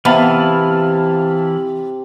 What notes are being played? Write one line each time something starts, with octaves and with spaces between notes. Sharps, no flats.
C3 E3 B3 F5 A5 B5 F6